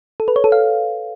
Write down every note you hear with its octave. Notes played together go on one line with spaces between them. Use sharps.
A4
B4
C#5
A4
F5